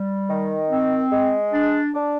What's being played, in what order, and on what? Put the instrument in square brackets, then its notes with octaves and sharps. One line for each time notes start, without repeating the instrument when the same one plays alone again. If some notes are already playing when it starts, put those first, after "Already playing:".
Already playing: [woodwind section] G3
D#3
C4
G#3
D4
D4